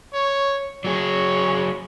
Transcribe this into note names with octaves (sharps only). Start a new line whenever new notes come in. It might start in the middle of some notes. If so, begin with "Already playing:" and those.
C#5
F#3 G#4 C#5